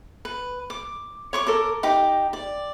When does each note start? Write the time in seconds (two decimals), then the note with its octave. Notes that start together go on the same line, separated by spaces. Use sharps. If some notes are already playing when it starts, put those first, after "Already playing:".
0.25 B4
0.70 D6
1.33 C#5 C#6 D6
1.47 A4 A#4 D6
1.83 D#4 G4 D6
2.33 D5